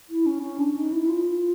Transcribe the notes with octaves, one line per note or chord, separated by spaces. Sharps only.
E4
C#4
C#4
D4
D#4
E4
E4
F4